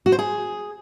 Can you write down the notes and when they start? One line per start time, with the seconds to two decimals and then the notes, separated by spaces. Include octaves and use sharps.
0.06 F#4
0.12 C5
0.19 G#4